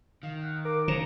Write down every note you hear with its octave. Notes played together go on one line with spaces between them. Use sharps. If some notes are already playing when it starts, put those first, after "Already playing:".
D#3 F5
F#5
A#4 D6
C#3 F3 A#5